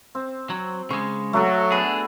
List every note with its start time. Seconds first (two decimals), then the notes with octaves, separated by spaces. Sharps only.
0.15 C4
0.50 F#3
0.90 C#3 G#3 C#6
1.33 F#3 A3 F#4 A4
1.72 B3 D4 G#4